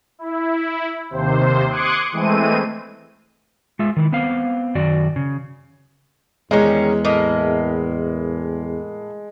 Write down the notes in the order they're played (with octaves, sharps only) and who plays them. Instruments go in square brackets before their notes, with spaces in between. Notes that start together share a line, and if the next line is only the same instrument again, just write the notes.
[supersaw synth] E4
D#2 C3 C5
C6 D6 D#6 F#6 G#6 C#7
E3 G#3 A3 C4 D#7
[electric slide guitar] G#3 F4 E5
D#3 E3 E4
B3 C4 F5
F#2 D#3 F#4 D5
C#3
[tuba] E2 [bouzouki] D#3 G3 C#4 [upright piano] G#3
[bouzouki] A2 A#3 D#5